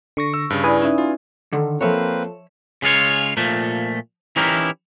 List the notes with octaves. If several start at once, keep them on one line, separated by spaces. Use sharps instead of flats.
D3 C#6 A#6
E6
G2 C#3
E4 B4 D5 G#5 D#6
C#4 D#4 E5
F4
D3 D#3 A4
F3 A#3 C4 A4 B4 C#5 E5
C#3 G#3 F4 C#5
A#2 F3 A3
E3 C#4 D#4 E4 G4 A#4